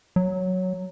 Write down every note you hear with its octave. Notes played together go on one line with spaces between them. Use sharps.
F#3